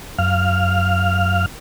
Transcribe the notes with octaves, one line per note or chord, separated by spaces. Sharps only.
F#2 F5 F6